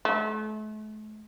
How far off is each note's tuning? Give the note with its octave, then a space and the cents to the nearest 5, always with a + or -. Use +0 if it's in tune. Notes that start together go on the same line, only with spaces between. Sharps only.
A3 -40